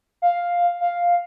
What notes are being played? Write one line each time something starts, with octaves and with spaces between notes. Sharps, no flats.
F5
F5